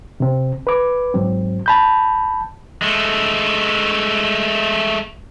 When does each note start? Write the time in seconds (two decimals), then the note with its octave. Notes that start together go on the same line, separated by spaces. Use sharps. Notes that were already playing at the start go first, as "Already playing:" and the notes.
0.20 C3 C4
0.67 B4 D6
1.14 G#2 F#3 C4
1.66 A5 B5 G6
2.82 G#3 A3